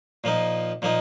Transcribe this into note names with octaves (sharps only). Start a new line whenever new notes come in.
A#2 F3 A#3 D#4
A#2 F3 A#3 D#4